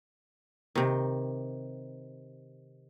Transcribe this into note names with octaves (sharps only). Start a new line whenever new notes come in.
C3 D#3